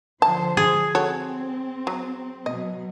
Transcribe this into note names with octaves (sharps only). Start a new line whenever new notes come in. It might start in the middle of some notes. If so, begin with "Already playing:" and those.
D3 F3 C5 A5
G#4
C4 F#4 A4 C#5
F#3
B2 F#3 D#5